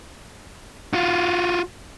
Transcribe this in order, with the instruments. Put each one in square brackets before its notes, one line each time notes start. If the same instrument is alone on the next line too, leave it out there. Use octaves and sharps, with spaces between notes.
[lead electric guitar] F4 F#4